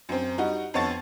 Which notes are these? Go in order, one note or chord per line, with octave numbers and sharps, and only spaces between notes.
F#2 C4
G3 D#4 F#4
F2 B3 C#5 A5 A6